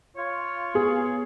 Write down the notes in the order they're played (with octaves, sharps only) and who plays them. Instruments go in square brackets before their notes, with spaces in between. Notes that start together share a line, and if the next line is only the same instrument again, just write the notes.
[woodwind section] F4 C#5
[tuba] B3 [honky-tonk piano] G#4